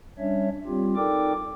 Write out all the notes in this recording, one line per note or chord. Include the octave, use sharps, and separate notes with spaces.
G3 C#4 D4 C#5 E5
G3 C4 F4 G4
D#4 A4 A#4 D5 G5 D6